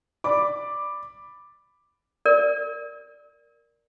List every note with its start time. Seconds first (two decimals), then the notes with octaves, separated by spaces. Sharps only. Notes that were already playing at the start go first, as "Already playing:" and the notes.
0.24 D5 B5 D6
2.26 A#4 D5